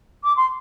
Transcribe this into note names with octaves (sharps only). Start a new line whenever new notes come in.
D6
C6